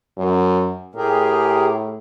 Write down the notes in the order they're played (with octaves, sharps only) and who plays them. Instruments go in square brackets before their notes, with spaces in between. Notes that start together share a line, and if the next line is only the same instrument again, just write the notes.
[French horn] F#2
[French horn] A2 [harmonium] G4 G#4 A#4